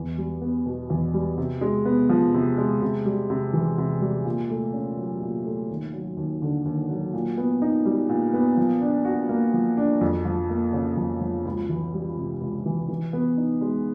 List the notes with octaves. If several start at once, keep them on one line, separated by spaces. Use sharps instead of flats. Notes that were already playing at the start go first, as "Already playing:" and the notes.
Already playing: E2
G3
B3
B2
E2
G3
C3
G#3
B3
F3
C3
G#3
C3
G3
C3
E3
C3
G3
A#2
A3
C#4
F#3
A#2
A3
D#2
F#3
D#2
D3
D#2
F#3
A#2
B3
D#4
G3
A#2
B3
F3
D4
F#4
A#3
F3
D4
F2
F3
A#3
C#3
F2
F3
C#2
E3
G3
C3
C#2
E3
E3
B3
D#4
G#3